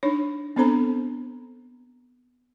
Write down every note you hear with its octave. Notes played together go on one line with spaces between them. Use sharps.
D4 D#4 C#5
B3 C4 D4 A4 C5 A#5